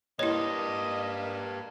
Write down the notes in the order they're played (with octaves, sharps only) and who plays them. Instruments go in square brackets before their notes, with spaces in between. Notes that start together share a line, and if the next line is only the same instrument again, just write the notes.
[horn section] A#3 [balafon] E4 C#5 [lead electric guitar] G4 B4 [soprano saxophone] D#5